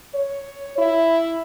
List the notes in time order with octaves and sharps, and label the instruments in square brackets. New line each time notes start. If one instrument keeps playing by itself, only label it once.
[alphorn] C#5
E4